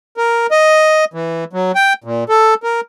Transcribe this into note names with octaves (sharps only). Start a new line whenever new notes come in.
A#4
D#5
E3
F#3
G5
A#2
A4
A#4